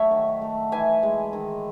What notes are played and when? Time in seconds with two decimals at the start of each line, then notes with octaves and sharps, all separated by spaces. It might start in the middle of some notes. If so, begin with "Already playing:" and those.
Already playing: F#3 A3 C#5 E5 F#5
0.11 D#3
0.41 A3
0.72 E3 E5 G#5
1.03 G#3
1.33 D#3